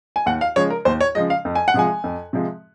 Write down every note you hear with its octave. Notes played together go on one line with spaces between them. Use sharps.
G#5
D#2 F#5
F5
C#3 F3 G#3 C#5
A#4
D#2 C5
C#5
C#3 F3 G#3 D#5
F5
F2
G#5
F#5
C3 F3 G#3 G#5
F2
C3 F3 G#3